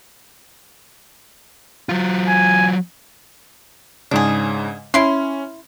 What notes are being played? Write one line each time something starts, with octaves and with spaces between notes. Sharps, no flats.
F#3 F4
G#5
G#2 C#3 D4 G#4
C#4 E4 C6